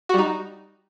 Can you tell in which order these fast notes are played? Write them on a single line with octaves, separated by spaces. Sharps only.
F#4 G3 D#4